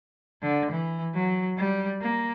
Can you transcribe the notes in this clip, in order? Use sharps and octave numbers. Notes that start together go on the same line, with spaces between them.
D3
E3
F#3
G3
A#3